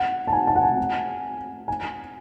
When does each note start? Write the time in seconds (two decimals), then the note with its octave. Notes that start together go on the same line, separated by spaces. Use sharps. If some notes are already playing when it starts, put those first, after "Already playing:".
Already playing: F#5
0.27 A5
0.33 G#5
0.47 A5
0.56 F#5
0.63 G#5
1.68 G#5